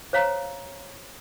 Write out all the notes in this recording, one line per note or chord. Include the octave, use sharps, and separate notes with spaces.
C5 C#5 F5 A#5